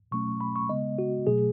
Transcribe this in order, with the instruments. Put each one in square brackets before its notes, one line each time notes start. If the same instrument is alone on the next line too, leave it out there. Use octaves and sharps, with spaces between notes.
[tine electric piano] B2 F#3 A3 C#4 C#6
B5
C#6
C#3 G#3 B3 D#5
F#4
B2 F#3 A3 G#4